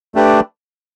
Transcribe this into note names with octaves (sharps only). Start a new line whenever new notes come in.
A3 D4 G4 B4